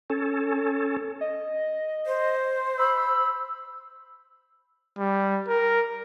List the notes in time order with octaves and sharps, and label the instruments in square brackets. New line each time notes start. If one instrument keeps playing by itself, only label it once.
[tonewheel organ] C#4 A4
[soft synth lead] D#5
[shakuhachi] C5
[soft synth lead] B5 [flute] E6
[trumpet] G3
A#4